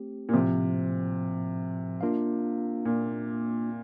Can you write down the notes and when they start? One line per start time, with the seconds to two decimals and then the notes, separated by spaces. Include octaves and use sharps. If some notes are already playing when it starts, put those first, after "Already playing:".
Already playing: A3 C4 G4
0.29 A#2
0.33 A2 C3 F3 C4
2.01 A#3 D4 F4 A#4 F5
2.85 A#2